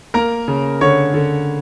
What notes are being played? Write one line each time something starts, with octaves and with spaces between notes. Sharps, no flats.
A#3 A#4 A#5
C#3
D3 C#5 C#6
D3